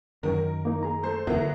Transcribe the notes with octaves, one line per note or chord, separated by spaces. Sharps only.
F#2 D#3 F#3 A#4
A#3 D#4
G#4 A#5
A3 C5
E2 D3 F#3 A#3 B3 A#4 E5